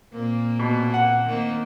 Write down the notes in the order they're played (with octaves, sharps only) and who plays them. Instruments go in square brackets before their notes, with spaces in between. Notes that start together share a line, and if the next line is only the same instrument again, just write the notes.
[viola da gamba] A#2 A#3 C4
[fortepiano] B2
F#5
[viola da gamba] D#3 A#3 C4